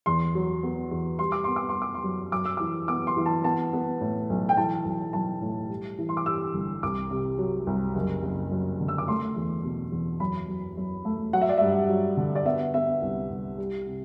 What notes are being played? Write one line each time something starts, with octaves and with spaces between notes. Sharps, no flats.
E2 C6
F#3
B3
E2
G3 C6
D6
B3 C6
D6
C6
B3
D6
C6
F#2
F#2 D6
E6
E3 D6
B3 D6
C6
E3
A5
B3 A5
B3
A2
B1
G5
E3 A5
B1
B1 A5
A2
G3
E3
C6
D6
G3 E6
G1
C2 D6
C3
F#3
C2
F#1
F#1
F#2
D3
E6
D6
A3 C6
E2
B2
E2
F#2 B5
F#2
F#2
A3
F#3 F#5
E5
D5
G2 E5
F#3
D3
D5
B3 E5
B3 E5
C2
C2
G3
C3